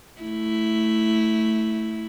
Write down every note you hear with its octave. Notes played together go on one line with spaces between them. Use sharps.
A3 E4